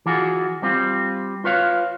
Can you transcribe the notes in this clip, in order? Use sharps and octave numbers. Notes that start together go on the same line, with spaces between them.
E3 F4 F#4 G#4
G3 C4 F4
F4 B4 C#5 F5